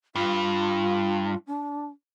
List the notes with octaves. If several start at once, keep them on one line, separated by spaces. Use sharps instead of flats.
G2 F4
D4